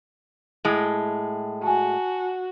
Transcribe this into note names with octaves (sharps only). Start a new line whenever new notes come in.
A2 G#3
F#4 G#5 A5